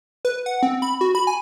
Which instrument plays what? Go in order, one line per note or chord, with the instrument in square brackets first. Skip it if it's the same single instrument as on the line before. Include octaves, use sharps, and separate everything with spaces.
[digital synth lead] B4
F#5
C4
B5
F#4
B5
G#5